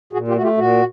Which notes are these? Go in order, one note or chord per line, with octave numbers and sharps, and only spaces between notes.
A#2 F#4 G#4
F4 G4
A3 F#4
F4 G4
A#2 F#4